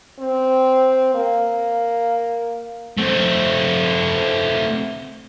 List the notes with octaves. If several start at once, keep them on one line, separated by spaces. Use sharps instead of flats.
C4
A#3
A3 C4